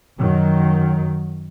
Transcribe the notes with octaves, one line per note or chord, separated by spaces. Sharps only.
F#2 D#3 F#3